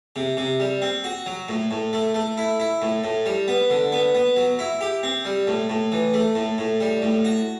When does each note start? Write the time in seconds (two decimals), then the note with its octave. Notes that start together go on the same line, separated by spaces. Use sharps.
0.16 C3
0.37 C3
0.60 G3
0.82 C4
1.04 F#4
1.26 F#3
1.48 A2
1.71 A2
1.93 A3
2.14 A3
2.37 E4
2.60 E4
2.82 A2
3.04 A2
3.26 G3
3.48 B3
3.70 D3
3.92 B3
4.15 B3
4.36 F#3
4.59 E4
4.81 G4
5.03 C4
5.25 G3
5.47 A2
5.70 A2
5.92 E3
6.14 A3
6.35 A2
6.58 A2
6.80 G3
7.02 A2
7.25 F#4